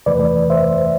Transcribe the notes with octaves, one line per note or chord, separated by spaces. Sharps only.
E2 C3 E3 A3 B4 D5
C5 E5